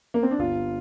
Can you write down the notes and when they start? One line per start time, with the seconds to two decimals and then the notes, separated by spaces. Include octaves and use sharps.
0.14 A#3
0.23 C4
0.31 D4
0.38 G1 F4